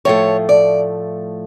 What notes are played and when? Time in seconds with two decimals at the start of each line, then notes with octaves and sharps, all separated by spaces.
0.05 A2 F3 A3 C#5
0.49 D5